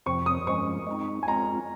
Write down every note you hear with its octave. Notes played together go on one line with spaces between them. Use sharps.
F2 C3 F3 C4 C#6
D#6
G2 F3 G#3 C#4 C#6
G#3 C4 D#4
G#5
G#3 C4 F4 A#5